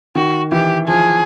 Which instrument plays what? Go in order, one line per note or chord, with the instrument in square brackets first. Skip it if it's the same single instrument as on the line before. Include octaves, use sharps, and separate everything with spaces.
[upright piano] D#3 [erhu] F#4
[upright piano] E3 [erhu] G4
[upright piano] F3 [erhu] G#4